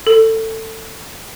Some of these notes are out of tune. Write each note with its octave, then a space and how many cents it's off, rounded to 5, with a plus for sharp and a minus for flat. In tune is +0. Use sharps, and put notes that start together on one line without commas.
A4 +20